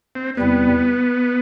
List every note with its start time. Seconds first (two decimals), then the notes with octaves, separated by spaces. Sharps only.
0.15 C4
0.37 E2 C3 G3 B3 C4 E4